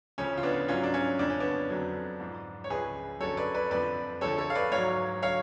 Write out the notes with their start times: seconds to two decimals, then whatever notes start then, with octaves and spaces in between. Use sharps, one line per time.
0.18 D2 C#3 F3 C#4
0.37 F4
0.43 B3 D4
0.68 G#2 F#3 C#4 F4
0.83 D4
0.94 C#4
1.19 F2 C#3 F3 D4
1.30 C#4
1.40 B3 D4
1.70 F2 D3 F#3
2.20 G#2 F3
2.64 C#5
2.70 C#2 C#3 F3 G#4 B4
3.20 F#2 D3 F#3 A4 C#5
3.37 B4 D5
3.54 B4 D5
3.71 F2 D3 F3 B4 D5
4.21 D2 D3 F3 A4 C#5
4.38 A4 C#5
4.50 F5
4.55 B4 D5
4.72 G#2 F#3 C#5 F5
5.23 D3 F#3 C#5 F5